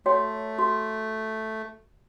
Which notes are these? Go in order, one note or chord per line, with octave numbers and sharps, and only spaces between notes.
A3 F#4 C#5 G5
F#4